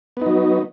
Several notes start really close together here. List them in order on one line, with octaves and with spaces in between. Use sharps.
B3 D#4 F#3